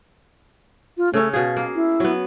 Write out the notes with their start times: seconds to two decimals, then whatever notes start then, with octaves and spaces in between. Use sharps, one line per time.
0.97 F4
1.14 C#3 A3 C#4
1.34 B2 G#4 F5
1.57 A#3
1.75 E4
2.00 F#3 B3